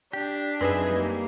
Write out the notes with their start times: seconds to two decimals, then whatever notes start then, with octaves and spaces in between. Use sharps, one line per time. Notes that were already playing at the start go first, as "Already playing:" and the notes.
0.13 D4 G4
0.61 F#2 C4 D#4 G#4 B4 E5
0.94 G3 A#3